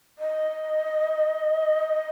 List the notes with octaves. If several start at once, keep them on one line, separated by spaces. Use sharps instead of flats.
D#5